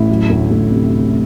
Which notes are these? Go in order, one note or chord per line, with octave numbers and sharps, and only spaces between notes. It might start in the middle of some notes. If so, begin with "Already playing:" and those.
Already playing: A1 A2 E4
F#3
D2
D2
C3